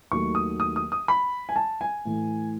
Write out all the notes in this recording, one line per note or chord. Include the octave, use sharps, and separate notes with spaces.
D#2 D#3 F#3 A3 C#6
D#6
D#6
D#6
D#6
B5
G#5
A5
G#5
A2 E3 A3